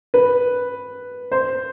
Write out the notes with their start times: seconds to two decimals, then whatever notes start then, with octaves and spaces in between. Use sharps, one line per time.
0.14 B4
1.32 C5